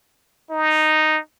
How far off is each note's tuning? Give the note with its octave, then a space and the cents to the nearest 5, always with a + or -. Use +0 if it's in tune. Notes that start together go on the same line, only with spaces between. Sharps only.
D#4 -5